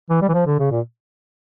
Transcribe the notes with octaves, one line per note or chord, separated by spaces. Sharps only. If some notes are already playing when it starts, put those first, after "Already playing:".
E3
G3
E3
F3
D3
C#3
A#2